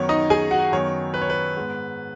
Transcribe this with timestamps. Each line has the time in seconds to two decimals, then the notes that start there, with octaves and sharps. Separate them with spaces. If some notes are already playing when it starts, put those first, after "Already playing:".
Already playing: F#2 D#3 B3 C#5
0.09 D#4 D#5
0.30 G#4 G#5
0.51 F#4 F#5
0.72 F#2 D#3 B3 C#5
1.14 B4
1.21 C#5
1.30 B4
1.56 G#2 G#3 B3